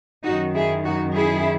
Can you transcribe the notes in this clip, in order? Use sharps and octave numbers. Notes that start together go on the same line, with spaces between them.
F#2 D#3 D#4 F#4
E4 G#4
D#4 F#4
E4 G#4